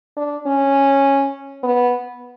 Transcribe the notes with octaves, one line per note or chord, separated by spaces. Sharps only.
D4
C#4
B3